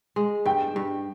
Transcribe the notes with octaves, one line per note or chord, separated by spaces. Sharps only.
G#3
G2 G5
G2